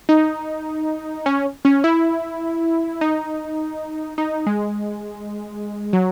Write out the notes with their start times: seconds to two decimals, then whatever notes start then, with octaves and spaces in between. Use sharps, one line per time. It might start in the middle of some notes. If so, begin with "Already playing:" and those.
0.09 D#4
1.26 C#4
1.65 C#4
1.84 E4
3.01 D#4
4.18 D#4
4.46 G#3
5.93 F#3